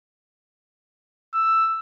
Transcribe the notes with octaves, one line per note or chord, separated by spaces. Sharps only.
E6